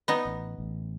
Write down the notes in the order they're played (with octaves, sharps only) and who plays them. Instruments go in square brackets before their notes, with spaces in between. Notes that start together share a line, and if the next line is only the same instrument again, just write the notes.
[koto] B3 D#4
[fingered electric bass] A1
A1